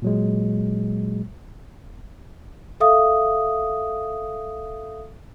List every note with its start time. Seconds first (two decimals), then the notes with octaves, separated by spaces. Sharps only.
0.02 A#2 F#3 G#3
2.80 A4 E5 F5 D#6